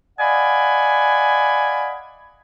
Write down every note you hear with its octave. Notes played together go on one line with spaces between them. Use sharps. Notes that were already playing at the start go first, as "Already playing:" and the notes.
D5 D#5 F5 F#5 G#5 B5